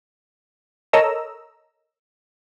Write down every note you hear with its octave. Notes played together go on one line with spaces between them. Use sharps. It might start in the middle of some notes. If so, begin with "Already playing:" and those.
A4 A#4 C#5 D#5 A#5 E6